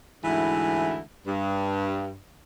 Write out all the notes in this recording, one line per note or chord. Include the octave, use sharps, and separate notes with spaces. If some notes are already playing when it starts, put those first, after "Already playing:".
D2 G#2 E3 E4
G2